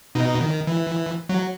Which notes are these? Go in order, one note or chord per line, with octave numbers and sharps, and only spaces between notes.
B2 D#4
D#3
E3
F#3